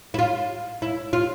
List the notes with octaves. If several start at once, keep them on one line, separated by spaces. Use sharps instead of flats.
E4
F4
E4
F4